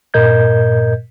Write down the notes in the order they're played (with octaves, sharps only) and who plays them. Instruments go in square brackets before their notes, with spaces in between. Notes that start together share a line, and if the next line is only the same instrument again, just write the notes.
[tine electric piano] G2 A#2 A#4 D#5 G6 G#6